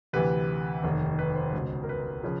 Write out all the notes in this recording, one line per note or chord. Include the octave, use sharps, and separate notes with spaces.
D2 C3 E3 B4
F1 D#2 D#3
B4
C5
C#2 B2
A#4
B4
C#3 F3